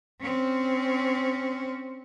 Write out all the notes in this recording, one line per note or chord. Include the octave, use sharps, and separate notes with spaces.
C4 C#4